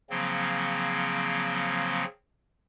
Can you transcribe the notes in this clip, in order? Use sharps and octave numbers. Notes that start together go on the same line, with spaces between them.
C#3 F3 F#3 A#3 C4